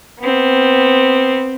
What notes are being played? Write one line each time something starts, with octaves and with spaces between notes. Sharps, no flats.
B3 C4